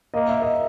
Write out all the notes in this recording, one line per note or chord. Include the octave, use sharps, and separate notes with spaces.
A#3 D#5
E5
D#5